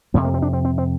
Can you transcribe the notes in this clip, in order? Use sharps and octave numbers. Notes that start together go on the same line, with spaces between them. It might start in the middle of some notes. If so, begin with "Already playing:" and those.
F2 C3 A#3
A#3
C4
D4
C4
C4
C4